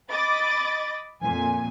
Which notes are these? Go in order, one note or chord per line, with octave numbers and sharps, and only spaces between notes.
D#5 B5 D6 A6
F2 A#2 G#5